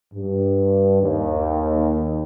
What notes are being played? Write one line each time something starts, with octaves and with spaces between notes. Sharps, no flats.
G2
D#2